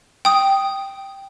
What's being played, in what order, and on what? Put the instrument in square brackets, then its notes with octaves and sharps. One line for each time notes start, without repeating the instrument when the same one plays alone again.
[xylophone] G5 D#6